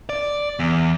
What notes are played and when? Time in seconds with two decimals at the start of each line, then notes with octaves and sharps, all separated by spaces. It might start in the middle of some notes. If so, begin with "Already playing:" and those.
0.09 D5
0.59 E2